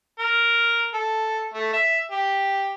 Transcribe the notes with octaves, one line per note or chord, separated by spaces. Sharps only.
A#4
A4
A3
E5
G4